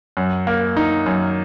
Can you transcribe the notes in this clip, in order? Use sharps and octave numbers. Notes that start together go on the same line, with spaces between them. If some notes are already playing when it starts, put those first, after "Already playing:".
F#2
A#3
D#4
F#2